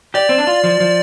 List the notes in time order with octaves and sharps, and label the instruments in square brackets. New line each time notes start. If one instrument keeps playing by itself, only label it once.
[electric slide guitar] G4 [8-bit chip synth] D5
[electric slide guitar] C4
D4
F4
F3
F3